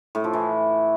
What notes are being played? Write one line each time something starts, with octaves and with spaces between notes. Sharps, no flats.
A2
F3
E3